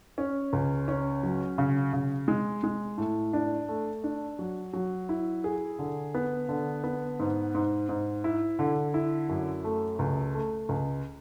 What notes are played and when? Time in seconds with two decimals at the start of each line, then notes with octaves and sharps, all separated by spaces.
0.18 C#4
0.53 C#2
0.88 C#4
1.23 F#3
1.58 C#3
1.93 C#3
2.28 G#3
2.64 G#3
2.98 A2
3.33 D4
3.68 A3
4.04 D4
4.39 F#3
4.73 F#3
5.09 E4
5.44 G#4
5.79 D3
6.14 B3
6.49 D3
6.84 B3
7.19 G#2
7.55 G#2
7.89 G#2
8.24 E4
8.59 D3
8.94 E4
9.29 F#2
9.64 A3
9.99 C#2
10.34 A3
10.69 C#2